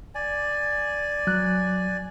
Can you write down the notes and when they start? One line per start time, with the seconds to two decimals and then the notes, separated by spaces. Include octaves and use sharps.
0.15 D5 G#5
1.27 F#3 F#6